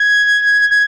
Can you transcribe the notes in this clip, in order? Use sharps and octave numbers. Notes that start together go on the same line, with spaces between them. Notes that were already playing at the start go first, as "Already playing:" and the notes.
Already playing: G#6
G#6